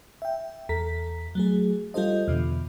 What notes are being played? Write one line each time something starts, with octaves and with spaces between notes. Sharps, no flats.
E5 G5
E2 A4 A#5 B6
F#3 A3 G#4
G3 F4 G4 A4 C5 D#5
E2 B2 D3